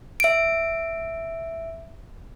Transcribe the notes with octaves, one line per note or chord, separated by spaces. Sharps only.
E5 D7